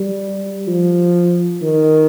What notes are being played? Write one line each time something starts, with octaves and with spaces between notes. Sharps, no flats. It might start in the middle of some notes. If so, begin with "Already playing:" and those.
Already playing: G3
F3
D#3